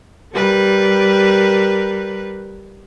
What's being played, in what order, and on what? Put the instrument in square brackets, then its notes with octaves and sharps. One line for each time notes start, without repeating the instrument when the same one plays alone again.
[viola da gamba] G3 A#4 B4